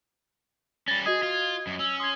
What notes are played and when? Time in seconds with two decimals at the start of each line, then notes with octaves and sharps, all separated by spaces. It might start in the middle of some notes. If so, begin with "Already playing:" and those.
0.88 G3 C#4 A6 A#6
1.06 F#4 G#4 D#5 D#6 G#6
1.23 F4
1.67 F#2
1.79 C#4 E6
2.00 C6 D#6 G#6